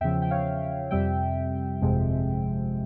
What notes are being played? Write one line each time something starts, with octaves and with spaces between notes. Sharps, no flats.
E2 C#3 F3 E5 G5
G5
C#5 F5
F2 C3 G3 E5 G5
G1 F2 C3 F3 G#3